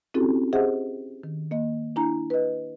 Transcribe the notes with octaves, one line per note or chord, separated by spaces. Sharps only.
C4 C#4 E4 F#4 G4 A4
G4 G#4 C5 D#5 E5 F#5
D#3
A#3 D#5
D4 E4 G#5 A#5
B4 D#5